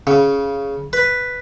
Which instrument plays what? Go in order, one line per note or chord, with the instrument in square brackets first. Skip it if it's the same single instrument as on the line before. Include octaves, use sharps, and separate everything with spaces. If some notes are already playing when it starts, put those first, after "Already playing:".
[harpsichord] C#3
B4